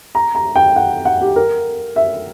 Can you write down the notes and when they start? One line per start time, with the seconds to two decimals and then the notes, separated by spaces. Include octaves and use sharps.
0.15 A#5
0.35 A#5
0.56 G5
0.76 F#5
1.05 F#5
1.21 G4
1.36 A#4
1.96 E5